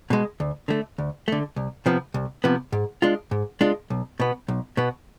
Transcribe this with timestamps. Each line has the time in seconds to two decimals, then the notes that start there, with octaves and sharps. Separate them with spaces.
0.10 B2 G#3
0.40 D2
0.68 D3 A3
0.98 D2
1.28 D3 A3
1.56 C2
1.86 C3 F3 B3
2.14 C2
2.44 C3 F3 B3
2.72 G#2
3.02 G#3 D4 F4
3.31 G#2
3.61 G#3 D4 F4
3.90 B1
4.20 B2 B3
4.48 B1
4.77 B2 B3